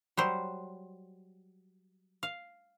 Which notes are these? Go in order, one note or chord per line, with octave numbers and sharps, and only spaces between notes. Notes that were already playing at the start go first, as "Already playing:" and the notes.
F#3 G3 C5
F5